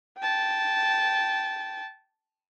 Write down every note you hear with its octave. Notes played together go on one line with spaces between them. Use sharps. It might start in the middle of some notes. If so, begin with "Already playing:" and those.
G5 A5